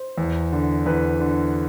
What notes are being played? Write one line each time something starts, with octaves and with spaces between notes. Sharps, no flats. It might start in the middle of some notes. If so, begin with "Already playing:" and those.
Already playing: C5
E2
D3
E2 B4
D3